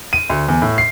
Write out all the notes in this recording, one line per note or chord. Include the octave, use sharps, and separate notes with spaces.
D#7
D2
E2
A2
C7